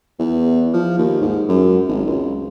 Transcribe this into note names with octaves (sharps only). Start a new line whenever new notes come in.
E2
F3
D#2
G#2
F#2
G#1
C#2